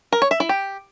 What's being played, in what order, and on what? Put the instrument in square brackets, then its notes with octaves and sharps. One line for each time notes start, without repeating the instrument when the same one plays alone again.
[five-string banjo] A#4
C#5
E5
E4
G4